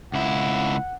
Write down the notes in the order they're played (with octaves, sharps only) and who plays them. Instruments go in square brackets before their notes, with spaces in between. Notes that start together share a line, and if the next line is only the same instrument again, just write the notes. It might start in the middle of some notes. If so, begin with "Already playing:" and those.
[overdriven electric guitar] C#2 E4 [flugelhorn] F#5